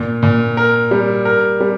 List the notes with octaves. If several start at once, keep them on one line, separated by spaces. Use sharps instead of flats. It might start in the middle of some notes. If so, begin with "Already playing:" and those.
Already playing: A#2
A#2
A#4
G3
A#4
G3